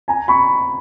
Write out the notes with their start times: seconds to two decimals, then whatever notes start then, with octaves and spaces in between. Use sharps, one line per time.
0.08 G#5 A#5
0.28 B5 C#6